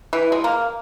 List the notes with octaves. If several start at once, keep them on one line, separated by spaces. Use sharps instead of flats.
E3
G#3
A#3